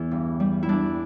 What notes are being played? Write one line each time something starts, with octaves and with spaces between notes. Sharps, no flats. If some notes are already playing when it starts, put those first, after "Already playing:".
Already playing: E2 E3 E4
G2
G3
E4
G3 D4